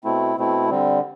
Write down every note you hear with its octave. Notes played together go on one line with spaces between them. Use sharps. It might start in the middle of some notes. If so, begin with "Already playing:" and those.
B2 A3 C4 E4
B2 A3 C4 E4
D3 G3 C4